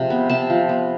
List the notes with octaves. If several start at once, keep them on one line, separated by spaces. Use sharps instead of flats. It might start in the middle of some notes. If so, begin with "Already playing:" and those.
Already playing: C3 F3 G#3
B3
C3 A5
F3
B3